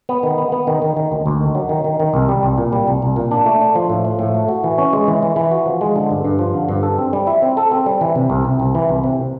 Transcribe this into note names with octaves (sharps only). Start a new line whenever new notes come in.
B3
D#3
B3
B3
D#3
D#3
D#3
D2
D2
D#3
F#3
D#3
D#3
D#3
C2
G3
C2
A#2
G3
C2
C2
A#2
D4
A3
D4
F3
A2
F3
A2
A3
F#4
E3
C#4
G#3
E3
E3
E3
F#4
F3
G#3
D3
G2
G2
F3
D3
G2
A4
C4
G3
E4
C4
A4
C4
G3
E3
C3
C2
C3
C2
E3
C2
C3